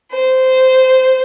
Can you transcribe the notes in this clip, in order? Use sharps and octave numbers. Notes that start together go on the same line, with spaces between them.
C5